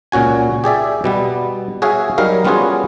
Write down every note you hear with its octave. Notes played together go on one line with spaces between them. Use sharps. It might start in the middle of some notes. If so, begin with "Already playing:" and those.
C#2 A#2 C#4 F#4 G#5
G4 G#4 D5 E5
B2 G3 B3
F#4 G#4 C#5 E5 F5 G#5
F#3 G3 D#4 A#4 F5
G3 B3 C#4 F4 F#4 G#4